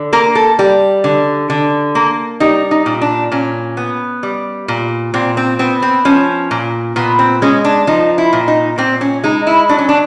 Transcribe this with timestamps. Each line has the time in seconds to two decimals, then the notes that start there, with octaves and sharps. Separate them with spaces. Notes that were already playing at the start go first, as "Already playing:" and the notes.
Already playing: D3
0.13 A#3 A#4
0.35 A4
0.59 G3
1.04 D3
1.50 D3
1.95 A#3
2.40 G3 D#4
2.71 D#4
2.86 A#2
3.01 D4
3.32 A#2 C#4
3.77 B3
4.23 G3
4.68 A#2
5.14 A#2 C4
5.37 C4
5.59 B3 C4
5.82 C4
6.05 F3 C#4
6.51 A#2
6.96 A#2 B3
7.19 C4
7.42 G#3 C#4
7.65 D4
7.87 F3 D#4
8.18 E4
8.33 A#2
8.48 D#4
8.78 A#2 C4
9.01 C#4
9.24 G#3 D#4
9.47 E4
9.69 F#3 D4
9.78 C#4
9.89 D4